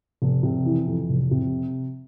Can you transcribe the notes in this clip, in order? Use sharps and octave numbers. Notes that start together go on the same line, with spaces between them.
F1
C3
E3
F2
F1
C3